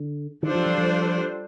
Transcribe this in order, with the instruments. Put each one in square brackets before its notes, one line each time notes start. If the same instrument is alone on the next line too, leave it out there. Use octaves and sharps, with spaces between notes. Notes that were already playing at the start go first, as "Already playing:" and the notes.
Already playing: [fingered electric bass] D3
[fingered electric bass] D#3 [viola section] G3 D4 F4 A4 C5
[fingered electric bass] F3
F3
F3